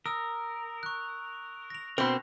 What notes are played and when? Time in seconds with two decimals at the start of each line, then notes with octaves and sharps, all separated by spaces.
0.06 A#4 D#6 E6
0.83 C#6 F#6
1.70 A#6 F7
1.98 B2 C4 A#4 C5 C6